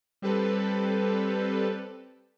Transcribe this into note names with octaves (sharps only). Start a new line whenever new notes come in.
G3 C4 G4 A4 B4